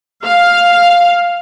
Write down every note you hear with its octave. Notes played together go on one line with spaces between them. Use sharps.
F5